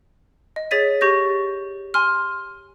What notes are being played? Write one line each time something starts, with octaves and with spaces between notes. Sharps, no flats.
D#5
G#4 C#5 A6 B6 D#7
G4 C#6 G6 A#6
G#5 C6 F6